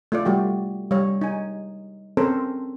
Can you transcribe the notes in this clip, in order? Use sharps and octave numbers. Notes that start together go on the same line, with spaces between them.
A3 F4 D5
G3 A3 F#4 G4
G3 C#5
D#4 G#5
C4 C#4 A4 A#4 C5